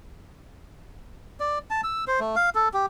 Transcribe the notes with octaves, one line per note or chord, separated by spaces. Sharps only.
D5
A5
E6
C5
A3
F5
A4
G4